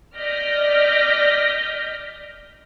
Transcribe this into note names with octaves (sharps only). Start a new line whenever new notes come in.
D5 D#5 F6 G6 A#6 B6